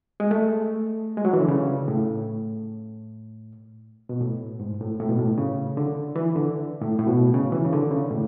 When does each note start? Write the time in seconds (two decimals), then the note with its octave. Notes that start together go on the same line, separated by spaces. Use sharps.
0.20 G#3
0.31 A3
1.17 G#3
1.25 F#3
1.33 E3
1.40 D3
1.48 C#3
1.88 A2
4.09 B2
4.21 A2
4.60 G#2
4.80 A2
4.99 A2
5.09 B2
5.19 A2
5.38 C#3
5.77 D3
6.16 E3
6.35 D3
6.81 A2
6.99 A2
7.07 B2
7.34 C#3
7.52 E3
7.65 C#3
7.73 D3
7.91 C#3
8.11 A2